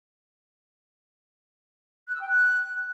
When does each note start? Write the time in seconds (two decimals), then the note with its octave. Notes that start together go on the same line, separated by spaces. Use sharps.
2.08 F#6
2.14 E6
2.21 G5
2.28 F#6